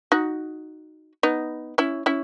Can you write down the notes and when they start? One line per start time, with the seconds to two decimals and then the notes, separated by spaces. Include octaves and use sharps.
0.12 D#4 F#4
1.23 B3 D#4
1.78 C#4 E4
2.06 C#4 E4